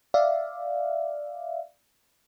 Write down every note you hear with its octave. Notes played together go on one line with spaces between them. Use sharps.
D5 E5 F5